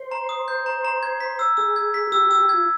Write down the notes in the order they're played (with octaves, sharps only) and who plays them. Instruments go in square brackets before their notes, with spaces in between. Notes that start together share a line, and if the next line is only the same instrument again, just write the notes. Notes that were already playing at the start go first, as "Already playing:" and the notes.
Already playing: [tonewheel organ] C5
[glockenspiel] A#5
D#6
G6
A#5
A#5
G#6
B6
E6
[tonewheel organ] G#4 [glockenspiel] E6
[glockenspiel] G#6
B6
[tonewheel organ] G4 [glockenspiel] E6
[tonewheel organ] G4 [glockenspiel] E6
[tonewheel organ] G4
[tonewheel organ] F4 [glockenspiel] G#6